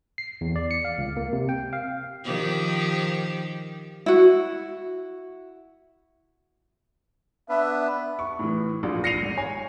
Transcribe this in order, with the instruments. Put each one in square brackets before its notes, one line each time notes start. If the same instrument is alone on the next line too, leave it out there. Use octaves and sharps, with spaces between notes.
[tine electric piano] C7
E2
D5
C#7
F5
C#2
A#3
C3
G5
F5
[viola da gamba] D#3 F3 G4
[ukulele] E4 F#4
[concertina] B3 D4 B4 [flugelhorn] E5
[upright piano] C#6
A2 E3
A#1 A#2
A#6 C7 C#7 D#7 F7
G#1
C#5 G#5